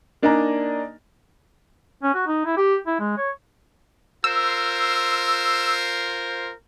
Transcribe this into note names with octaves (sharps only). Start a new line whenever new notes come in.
A#3 D4 D#4 D5 G#5 A#5
C#4
F#4
D#4
E4
G4
E4
G#3
C#5
F4 A#4 C5 E6